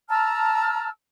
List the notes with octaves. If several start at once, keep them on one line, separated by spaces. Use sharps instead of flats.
A5 A#5 E6 F6